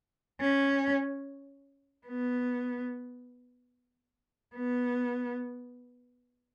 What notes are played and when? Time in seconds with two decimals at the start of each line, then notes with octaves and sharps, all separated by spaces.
0.41 C#4
2.07 B3
4.55 B3